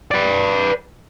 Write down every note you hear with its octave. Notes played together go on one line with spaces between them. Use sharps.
B4 D5